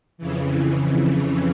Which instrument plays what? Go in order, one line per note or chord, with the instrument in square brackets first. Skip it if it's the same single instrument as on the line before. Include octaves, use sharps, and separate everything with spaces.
[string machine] F2 C#3 E3